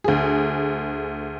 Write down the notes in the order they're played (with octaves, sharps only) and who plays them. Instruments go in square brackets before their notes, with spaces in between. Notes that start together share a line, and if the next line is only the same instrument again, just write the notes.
[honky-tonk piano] D2 G#4